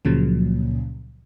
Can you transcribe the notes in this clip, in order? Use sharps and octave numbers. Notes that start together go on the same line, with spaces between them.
C#2 A#2 C#3 F3 F#3